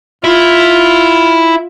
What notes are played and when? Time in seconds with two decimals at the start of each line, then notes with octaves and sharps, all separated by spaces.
0.24 E4 F4